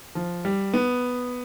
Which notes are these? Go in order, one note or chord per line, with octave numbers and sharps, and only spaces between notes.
F3
G3
B3